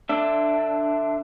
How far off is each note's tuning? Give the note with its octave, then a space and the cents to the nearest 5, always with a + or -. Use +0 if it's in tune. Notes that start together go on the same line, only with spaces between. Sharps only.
D3 +20 D4 +0 E5 +0